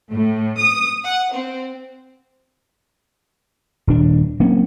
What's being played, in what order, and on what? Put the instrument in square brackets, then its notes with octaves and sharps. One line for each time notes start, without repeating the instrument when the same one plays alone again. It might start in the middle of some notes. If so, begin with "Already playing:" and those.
[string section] A2
D#6
F#5
C4
[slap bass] D#1 D4
F#3 A#3 C4 C#4